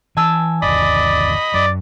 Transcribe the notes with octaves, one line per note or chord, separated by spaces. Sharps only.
E3 G#5 A5 E6
G1 D#2 D5 D#5 B5
F#2 D5